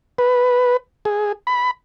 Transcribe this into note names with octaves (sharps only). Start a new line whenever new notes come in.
B4
G#4
B5